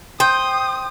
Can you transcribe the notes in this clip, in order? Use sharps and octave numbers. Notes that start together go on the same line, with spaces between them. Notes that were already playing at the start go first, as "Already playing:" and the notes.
C5 G5 D#6